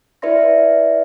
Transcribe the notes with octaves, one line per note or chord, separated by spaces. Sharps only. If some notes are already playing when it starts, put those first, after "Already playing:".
E4 B4 D5 E5 C6 A#6